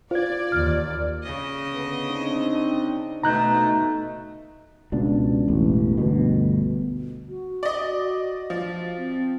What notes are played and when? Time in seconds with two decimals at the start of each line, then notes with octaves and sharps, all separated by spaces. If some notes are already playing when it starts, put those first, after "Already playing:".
0.11 F4 C5 D5 G#6
0.52 D#2 F6
1.23 C#3 D#5
1.73 D3 B3
2.11 C4 D4 D#4
3.23 B2 A3 D#4 A#5 F#6 G6
4.92 C#2 B2 D4
5.48 E1 A1
5.98 G1 D2 B2
7.29 F#4
7.63 D5 D#5
8.50 F3
8.97 C4